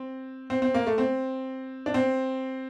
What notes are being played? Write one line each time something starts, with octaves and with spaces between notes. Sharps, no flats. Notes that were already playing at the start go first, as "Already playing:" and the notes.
Already playing: C4
C4
C4
A#3
A3
C4
D4
C4